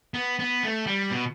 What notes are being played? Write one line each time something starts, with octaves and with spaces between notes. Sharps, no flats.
B3
B3
A3
G3
B2